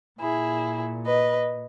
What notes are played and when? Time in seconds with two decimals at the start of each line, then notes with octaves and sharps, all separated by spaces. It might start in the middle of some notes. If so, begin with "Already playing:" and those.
0.20 A#2 E4 G#4
1.06 B4 D#5